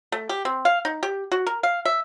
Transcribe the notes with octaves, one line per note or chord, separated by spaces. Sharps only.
A3
G4
C4
F5
D#4
G4
F#4
A#4
F5
E5